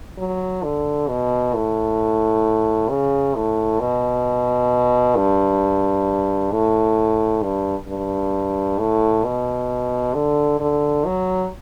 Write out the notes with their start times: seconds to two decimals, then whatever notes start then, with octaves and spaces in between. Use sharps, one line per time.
0.19 F#3
0.63 D3
1.09 B2
1.54 A2
2.90 C#3
3.35 A2
3.80 B2
5.16 G2
6.52 A2
7.43 G2
7.88 G2
8.79 A2
9.25 B2
10.14 D3
10.60 D3
11.06 F#3